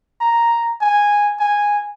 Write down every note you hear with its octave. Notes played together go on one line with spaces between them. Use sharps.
A#5
G#5
G#5